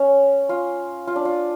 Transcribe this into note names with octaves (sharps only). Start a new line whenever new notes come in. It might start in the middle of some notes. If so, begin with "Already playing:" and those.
Already playing: C#4
F4
F4
D4
F4